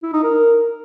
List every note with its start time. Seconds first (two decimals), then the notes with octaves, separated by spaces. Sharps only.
0.03 E4
0.13 D#4
0.23 A#4